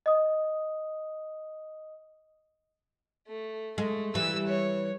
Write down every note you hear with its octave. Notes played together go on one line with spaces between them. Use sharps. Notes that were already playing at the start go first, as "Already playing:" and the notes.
D#5 D#6
A3
G#3 A3
E3 G3 E6
C#5